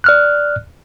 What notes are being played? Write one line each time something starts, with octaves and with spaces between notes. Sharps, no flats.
D5 F6 F#6